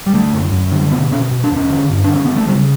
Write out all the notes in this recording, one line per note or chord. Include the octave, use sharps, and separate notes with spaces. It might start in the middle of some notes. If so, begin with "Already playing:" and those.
G3
D3 A3
F#2
F#2
D3
B2 B3
B2 C#4
B2
D4
E2
C#4
D3
G2
D3 D4
C#4
D3 B3
A3
C#3 G3